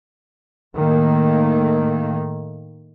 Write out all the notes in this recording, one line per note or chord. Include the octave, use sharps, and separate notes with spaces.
A2 D#3 A3 A#3